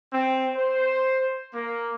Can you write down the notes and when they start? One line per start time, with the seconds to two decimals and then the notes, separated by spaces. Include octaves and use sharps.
0.13 C4
0.55 C5
1.54 A#3